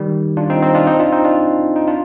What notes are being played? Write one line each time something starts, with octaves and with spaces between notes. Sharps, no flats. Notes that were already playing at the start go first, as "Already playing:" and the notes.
Already playing: D#3 G3
D4 F4
C4 D#4
C4 D#4
D4 F4
C4 D#4
D4 F4
C4 D#4
D4 F4
D#4
D4 F4